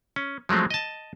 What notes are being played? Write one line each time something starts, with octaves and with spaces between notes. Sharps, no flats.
C#4
F3 F#3 G#3 A3 C4
D#5 A5